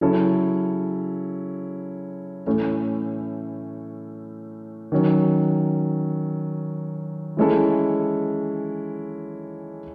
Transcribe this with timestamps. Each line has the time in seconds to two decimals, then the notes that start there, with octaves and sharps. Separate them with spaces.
0.01 C#3 F#3 C#4 E4 A4
2.47 A2 E3 A3 C#4
4.92 D#3 F#3 C#4
7.37 E3 G#3 C#4 E4 A4